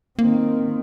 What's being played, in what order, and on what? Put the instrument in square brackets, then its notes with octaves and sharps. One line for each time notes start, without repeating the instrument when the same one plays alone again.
[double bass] D#3 C4 [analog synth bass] A#3